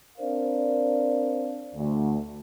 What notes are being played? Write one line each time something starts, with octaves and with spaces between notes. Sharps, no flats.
C4 D4 A#4 C5 D5 F5
D2